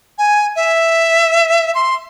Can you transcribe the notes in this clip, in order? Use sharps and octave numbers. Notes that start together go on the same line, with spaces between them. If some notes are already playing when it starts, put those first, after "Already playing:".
G#5
E5
C6